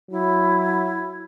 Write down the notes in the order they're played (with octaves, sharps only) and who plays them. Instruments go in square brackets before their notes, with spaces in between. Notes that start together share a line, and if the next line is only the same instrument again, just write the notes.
[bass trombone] F#3 [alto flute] E4